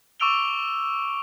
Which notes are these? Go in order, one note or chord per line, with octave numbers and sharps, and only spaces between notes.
C#6 D6 E6 D7 F7 G7